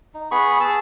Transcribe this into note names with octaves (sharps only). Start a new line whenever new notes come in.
D#4
B3 G#4 B5 C#6
G#4 A5 E6